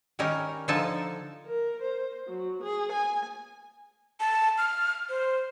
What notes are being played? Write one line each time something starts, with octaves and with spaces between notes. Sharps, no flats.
D#3 G3 C#4 D#4 A#4
D3 F3 D#4 A4 G#5 A5
A#4
C5
F#3
G#4
G#5
A5
F6
C5